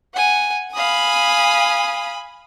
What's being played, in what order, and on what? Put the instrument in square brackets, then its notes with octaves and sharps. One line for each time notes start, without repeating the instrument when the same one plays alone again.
[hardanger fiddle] F#5 G#5
[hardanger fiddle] F5 D#6 [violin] G#5 B5